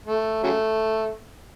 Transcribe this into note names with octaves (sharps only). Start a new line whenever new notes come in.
A3
C#3 F#3 A3